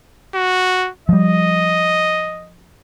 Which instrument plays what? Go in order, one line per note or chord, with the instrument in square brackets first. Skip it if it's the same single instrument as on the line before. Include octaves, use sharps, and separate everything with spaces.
[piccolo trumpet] F#4
[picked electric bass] F3 G3 [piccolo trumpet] D#5